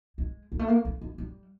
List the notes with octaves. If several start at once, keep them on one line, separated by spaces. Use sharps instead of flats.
G#3
G3
A3
A#3
A3
G#3
G3